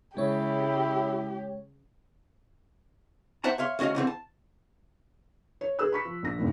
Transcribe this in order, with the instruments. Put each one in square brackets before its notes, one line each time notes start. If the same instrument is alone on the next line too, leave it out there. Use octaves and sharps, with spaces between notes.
[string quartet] C#3 [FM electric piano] G#3 C#5 [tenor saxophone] E4 [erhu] G4
[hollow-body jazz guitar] C5 E5 F#5 A5 A#5
C#5 E5 F5 C6
D2 C#4 F#4 D#5 F5
D3 E3 A3 C4
A5
[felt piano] C#5
G#4 B4 E6 F#6
B5 C#6 B6
F3
A#1 A#6
F#1 D2 A2 D#3